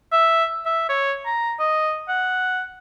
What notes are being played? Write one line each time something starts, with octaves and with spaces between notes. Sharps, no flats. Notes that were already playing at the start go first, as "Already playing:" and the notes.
E5
E5
C#5
A#5
D#5
F#5